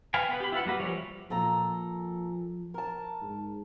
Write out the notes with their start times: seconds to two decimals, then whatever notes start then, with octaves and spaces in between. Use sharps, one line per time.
0.14 B4 F5 G5 G#5
0.29 B3 B4
0.40 G4 B5
0.52 E4 F4 B4 F#5
0.66 G3 A#3 F#4 B4
0.80 E3 F3 G3 C#5
1.30 A#2 F3 A4 A#5
2.74 A#4 A5
3.21 G#2